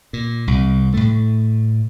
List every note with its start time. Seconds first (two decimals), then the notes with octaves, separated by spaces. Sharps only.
0.13 A#2
0.47 C2
0.94 A2 A3